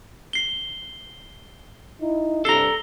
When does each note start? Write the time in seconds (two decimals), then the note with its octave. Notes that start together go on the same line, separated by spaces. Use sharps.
0.33 C7 G7
2.01 D#4 E4
2.45 G2 C3 A4 A#5 C7 G7